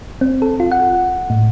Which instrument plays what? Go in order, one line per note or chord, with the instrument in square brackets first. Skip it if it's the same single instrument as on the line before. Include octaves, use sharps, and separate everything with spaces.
[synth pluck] C4
A4
F4
F#5
A2